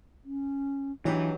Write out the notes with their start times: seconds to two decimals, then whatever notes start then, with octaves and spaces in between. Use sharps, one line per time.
0.25 C#4
1.05 E3 F#3 D4 D#4 G4